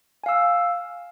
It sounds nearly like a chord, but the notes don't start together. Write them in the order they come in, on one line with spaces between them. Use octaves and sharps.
G#5 F5 E6